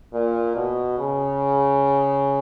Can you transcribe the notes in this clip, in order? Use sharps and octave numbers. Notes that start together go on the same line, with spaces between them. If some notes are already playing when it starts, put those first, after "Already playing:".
A#2
B2
C#3